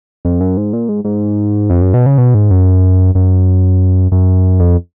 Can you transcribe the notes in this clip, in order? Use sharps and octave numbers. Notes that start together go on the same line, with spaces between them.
F2
F#2
G#2
A#2
G#2
G#2
F2
F#2
B2
C#3
B2
G#2
F#2
F#2
F#2
F2